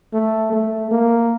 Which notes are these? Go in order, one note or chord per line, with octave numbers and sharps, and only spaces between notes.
A3
A3
A#3